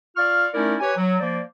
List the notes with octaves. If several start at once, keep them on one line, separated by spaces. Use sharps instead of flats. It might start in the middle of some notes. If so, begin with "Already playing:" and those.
F4 D5 F5 C#6 F6
A3 C#4 D#4 E4 A#4 D5
G4 B4 C#5 G#5
F#3
F3 A#3 C5 D5